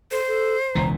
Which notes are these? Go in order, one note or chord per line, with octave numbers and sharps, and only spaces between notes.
A4 C5
A4
E1 C#2 E3 A#5